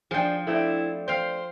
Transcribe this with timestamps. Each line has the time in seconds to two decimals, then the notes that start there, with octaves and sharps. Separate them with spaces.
0.11 F3 D4 G#4 G5
0.47 A3 C4 D4 E4
1.08 C5 F5 G5